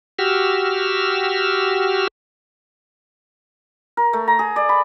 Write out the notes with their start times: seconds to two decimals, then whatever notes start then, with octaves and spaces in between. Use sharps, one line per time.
0.19 F#4 G4 E6 F6
3.97 A#4
4.13 A3
4.28 A#5
4.39 G#4
4.56 D5
4.69 B5